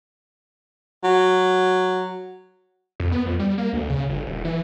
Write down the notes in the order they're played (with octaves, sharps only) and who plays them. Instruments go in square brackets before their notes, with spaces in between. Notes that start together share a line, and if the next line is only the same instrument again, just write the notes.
[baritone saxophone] F#3
[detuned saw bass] F2
B3
F2
G3
A#3
D2
C#3
G1
D#1
E3